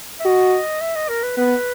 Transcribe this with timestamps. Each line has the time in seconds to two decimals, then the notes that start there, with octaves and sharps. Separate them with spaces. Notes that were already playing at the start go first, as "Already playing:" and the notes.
0.20 E5
0.25 F#4 D#5
0.81 E5
0.96 D#5
1.09 A#4
1.23 B4
1.37 B3 B4